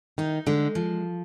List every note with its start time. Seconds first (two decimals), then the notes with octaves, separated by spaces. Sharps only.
0.18 D#3 D#4
0.46 D3 G#3
0.75 F3